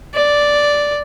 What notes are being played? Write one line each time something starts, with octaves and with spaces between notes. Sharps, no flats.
D5